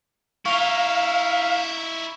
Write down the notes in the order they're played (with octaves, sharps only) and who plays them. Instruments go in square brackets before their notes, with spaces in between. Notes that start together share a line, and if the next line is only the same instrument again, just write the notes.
[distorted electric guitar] D#4 E4 [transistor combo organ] F5 [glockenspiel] C#6 F7